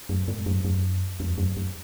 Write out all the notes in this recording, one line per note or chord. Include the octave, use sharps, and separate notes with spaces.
F#2
G#2
F#2
F#2
F2
F#2
F#2